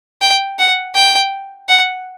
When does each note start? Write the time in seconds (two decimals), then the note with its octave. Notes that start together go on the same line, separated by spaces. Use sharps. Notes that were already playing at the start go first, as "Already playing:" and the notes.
0.21 G5
0.59 F#5
0.95 G5
1.69 F#5